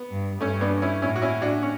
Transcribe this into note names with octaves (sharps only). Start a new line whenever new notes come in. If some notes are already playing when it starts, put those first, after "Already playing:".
Already playing: B3
G2
G2 A3 C#4
B3 D4
C#4 E4
A2 C#4 E4
F#4
C#4 E4
D4 F#4
C#4